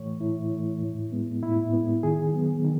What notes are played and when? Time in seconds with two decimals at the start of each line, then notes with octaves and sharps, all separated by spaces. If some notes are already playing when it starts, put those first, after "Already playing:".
Already playing: A2 E3 A3 C#5
0.21 A2 E4
0.51 E3 A3
0.81 A2
1.12 G#3 B3
1.42 A2 E4
1.73 G#3 B3
2.03 D#3 G#4
2.33 F#3 B3
2.64 D#3